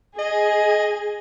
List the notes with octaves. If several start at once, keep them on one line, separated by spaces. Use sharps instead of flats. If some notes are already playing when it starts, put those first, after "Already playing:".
G#4 D#5